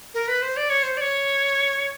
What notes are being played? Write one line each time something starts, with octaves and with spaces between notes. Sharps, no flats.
A#4
B4
C5
D5
C#5
C5
D5
C#5